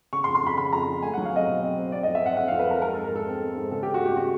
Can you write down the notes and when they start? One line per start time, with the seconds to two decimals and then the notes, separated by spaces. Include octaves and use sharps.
0.13 C#3 C#6
0.24 C6
0.28 F2
0.35 C6
0.43 F2 B5
0.58 C#3 B5
0.73 F2 A#5
0.88 F2
1.02 A3 G#5
1.14 F#5
1.18 F#3
1.25 F5
1.33 C4 D#5
1.48 B2
1.62 C4
1.78 C4
1.92 C4 D5
2.03 D#5
2.07 F2
2.15 E5
2.22 C4 F#5
2.37 C4 F#5
2.48 F5
2.52 F2
2.59 B4
2.67 F2 A#4
2.82 G#3 A#4
2.93 A4
2.97 G#2
3.04 A#4
3.12 G#3 A4
3.27 C4
3.42 C4
3.56 G#2
3.71 C#3 A4
3.83 G4
3.86 C#3
3.94 F#4
4.01 A3 G4
4.17 C#3 F#4